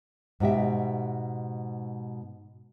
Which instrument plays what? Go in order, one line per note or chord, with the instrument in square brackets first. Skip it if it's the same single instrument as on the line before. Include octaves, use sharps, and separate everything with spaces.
[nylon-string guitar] G#2 B2 G4 E5